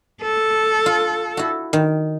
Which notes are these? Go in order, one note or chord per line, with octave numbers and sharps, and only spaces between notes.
A4
F4
E4 F#4
D#3